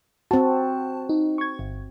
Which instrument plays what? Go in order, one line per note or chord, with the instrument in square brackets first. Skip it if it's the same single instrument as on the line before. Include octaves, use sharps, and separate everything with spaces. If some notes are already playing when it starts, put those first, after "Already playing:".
[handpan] C4 F#4 [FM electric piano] A5
[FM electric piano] D#4
C#6 G#6
G1